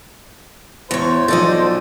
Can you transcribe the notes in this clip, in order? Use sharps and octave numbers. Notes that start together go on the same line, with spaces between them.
E2 C5 C#5
B1 B2 F3 A4 D5 D#5